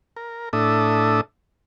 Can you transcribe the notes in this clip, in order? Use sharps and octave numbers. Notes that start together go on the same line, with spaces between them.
A#4
A2 D4 A4 E5 D#6